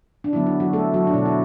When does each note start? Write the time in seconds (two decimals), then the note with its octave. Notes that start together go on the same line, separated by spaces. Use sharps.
0.24 D4
0.33 D3 F#3 B3 E4
0.47 E4
0.60 F#3 F#4
0.73 A3 A4
0.94 F#3 F#4
1.07 D4
1.14 B2 E4
1.18 B3
1.26 E4